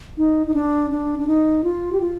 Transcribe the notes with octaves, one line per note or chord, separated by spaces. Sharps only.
D#4
D#4
D4
D4
D4
D#4
F4
G4
F4